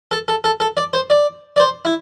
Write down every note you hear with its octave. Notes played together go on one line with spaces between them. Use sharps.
A4
A4
A4
A4
D5
C5
D5
D5
C5
E4